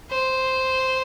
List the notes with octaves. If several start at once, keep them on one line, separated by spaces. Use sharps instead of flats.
C5